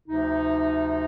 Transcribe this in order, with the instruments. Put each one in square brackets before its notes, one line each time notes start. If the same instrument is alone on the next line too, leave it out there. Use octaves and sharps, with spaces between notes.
[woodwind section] D2 C3 F3 D#4